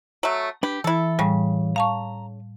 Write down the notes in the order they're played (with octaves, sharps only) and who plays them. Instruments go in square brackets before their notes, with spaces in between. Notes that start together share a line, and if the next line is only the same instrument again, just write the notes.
[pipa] F#3 A3
[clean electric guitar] D4 B4 B5 [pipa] G4
[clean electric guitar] E3 [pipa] E4 A4
[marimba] A2 G3 [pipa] C#3
[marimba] F5 A5 C#6 [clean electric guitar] A#5